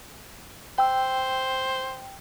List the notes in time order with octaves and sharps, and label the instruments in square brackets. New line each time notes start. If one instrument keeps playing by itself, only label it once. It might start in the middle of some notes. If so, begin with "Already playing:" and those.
[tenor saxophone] C5 [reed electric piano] G5 E6